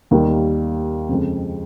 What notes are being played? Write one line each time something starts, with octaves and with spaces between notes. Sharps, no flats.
D#2 D#3 G3 A#3
F2 C#3 G#3